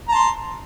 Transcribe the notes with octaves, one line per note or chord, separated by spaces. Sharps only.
A5 A#5 C6